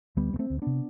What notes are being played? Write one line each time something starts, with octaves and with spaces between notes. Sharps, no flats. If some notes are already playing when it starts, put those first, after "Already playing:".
D2 G3 B3
D2 B3
A3 C4
D2
C3 B3 D4